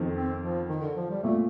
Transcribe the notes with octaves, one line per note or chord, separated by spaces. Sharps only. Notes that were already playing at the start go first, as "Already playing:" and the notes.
Already playing: F2 D#3
C4
F3
D#3
D3
F3
G3
A#2 A3